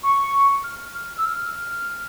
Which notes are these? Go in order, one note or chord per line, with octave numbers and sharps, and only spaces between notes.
C#6
F6
F6
E6
F6